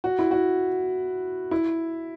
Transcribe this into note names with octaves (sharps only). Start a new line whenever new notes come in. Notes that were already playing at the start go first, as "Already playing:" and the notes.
F#4
E4
F#4
E4